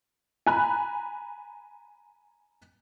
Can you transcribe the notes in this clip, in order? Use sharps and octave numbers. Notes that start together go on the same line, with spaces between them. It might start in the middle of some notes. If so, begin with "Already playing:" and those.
G#5 A#5 B5 F#6